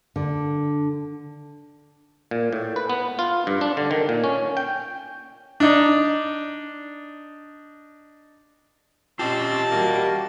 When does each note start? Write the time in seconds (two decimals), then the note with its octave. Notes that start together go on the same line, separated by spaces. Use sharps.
0.16 D3
2.31 A#2
2.52 A2
2.76 B4
2.90 B3
3.19 F4
3.47 G2
3.61 D4
3.77 D3
3.91 D#3
4.09 A#2
4.24 C#4
4.57 G5
5.60 D4 D#4 D5
9.19 C4 C#4 F4 G4 D#5 A5
9.71 G3 A#3 F#4